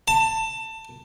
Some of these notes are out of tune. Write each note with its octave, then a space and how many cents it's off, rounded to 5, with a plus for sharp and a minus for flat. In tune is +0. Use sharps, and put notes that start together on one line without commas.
A5 +20